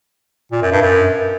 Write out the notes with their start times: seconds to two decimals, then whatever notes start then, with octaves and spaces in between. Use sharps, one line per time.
0.52 A#2
0.62 F#2
0.72 G2
0.81 F#2